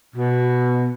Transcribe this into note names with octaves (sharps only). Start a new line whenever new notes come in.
B2